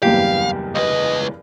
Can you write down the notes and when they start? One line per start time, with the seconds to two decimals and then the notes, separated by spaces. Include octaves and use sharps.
0.03 F#1 E2 G2 G4 F5
0.75 C#2 B4 D#5